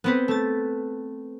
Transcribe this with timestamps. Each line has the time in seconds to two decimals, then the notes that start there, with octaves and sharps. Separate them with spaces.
0.04 B3 C4 B4
0.28 A3 A6